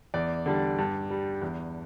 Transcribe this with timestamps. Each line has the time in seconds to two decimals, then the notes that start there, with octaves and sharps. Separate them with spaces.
0.14 E2 D5
0.46 D3 G3
0.79 G2
1.10 G3
1.41 E2